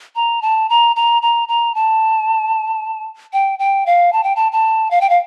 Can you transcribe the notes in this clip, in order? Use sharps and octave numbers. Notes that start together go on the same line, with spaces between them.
A#5
A5
A#5
A#5
A#5
A#5
A5
G5
G5
F5
A5
G5
A5
A5
F5
G5
F5